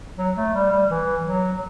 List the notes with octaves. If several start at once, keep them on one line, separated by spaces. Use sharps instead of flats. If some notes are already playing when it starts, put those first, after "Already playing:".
F#3
A3
G3
G3
E3
F#3